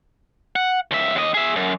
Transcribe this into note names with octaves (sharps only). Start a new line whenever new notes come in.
F#5
C#2 E5
D#2 D#5
G#4 E5
F#2